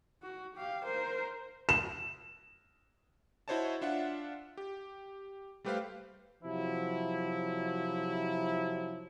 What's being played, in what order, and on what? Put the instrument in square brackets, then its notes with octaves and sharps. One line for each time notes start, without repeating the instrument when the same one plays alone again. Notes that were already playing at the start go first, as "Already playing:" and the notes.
[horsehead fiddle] F#4
G4 F5
A#4 C5
[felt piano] E7
[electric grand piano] E4 F#4 C5 C#5 D#5 A5
D4 F4 E5 F#5
G4
G3 A3 G4 B4 C5 F5
[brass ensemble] C3 F3 F#3 E4